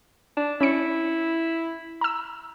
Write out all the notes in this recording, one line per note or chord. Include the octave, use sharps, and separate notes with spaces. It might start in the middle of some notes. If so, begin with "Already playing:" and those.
D4
C#4 E4 C#7
A#5 E6